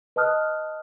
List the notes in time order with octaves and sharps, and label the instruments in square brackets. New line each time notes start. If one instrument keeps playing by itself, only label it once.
[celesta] B4 D#5 A5 D#6 F6 F#6